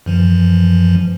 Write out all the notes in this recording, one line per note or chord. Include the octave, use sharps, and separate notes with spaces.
F#2 E3 F3